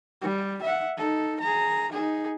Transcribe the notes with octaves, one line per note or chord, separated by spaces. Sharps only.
G3
E5 F#5
D#4 A4
G#4 A#5
D#4 G#4